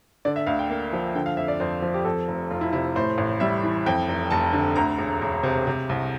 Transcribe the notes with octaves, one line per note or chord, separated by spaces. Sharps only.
D3 D5
E5
D2 F5
G5
A#3
F3
D3 G5
F5
F2 E5
D5
F2 C5
F3
G4
F2 A4
F1
F1 F4
E4
C3 E4
A2 C5
A1
G3 E5
E3
F2 G5
F1
F1 A5
D3
D2 A#5
E1
E1
C3
C3
C2